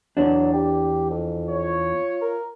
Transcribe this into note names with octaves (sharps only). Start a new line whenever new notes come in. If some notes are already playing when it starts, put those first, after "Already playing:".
E2 F#3 D4
G4
F2
F4 C#5
A#4